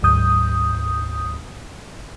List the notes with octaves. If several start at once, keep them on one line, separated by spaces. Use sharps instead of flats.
G1 D2 G#2 F#3 D#6 G6